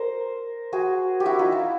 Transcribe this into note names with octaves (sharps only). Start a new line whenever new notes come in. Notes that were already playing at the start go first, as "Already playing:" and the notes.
Already playing: A#4 C5
F#4 G#4
G4
E4 F#4
D#4 F4
E4